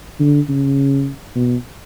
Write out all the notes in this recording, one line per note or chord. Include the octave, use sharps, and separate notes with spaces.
D3
C#3
B2